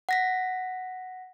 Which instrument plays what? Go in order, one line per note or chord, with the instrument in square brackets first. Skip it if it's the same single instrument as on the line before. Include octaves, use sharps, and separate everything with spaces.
[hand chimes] F#5 A#6 B6